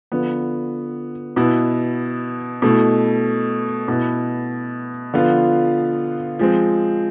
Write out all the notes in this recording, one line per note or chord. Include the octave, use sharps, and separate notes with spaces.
D3 F3 B3
B2 B3 E4
B2 A3 E4
B2 B3 E4
D3 F3 B3 F4
F3 G#3 C4